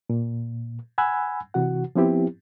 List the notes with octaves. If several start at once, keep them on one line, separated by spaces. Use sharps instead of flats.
A#2
F#5 G#5 B5 E6 F#6 G#6
C3 E3 F#4 F#5
F3 B3 C4 E4 G4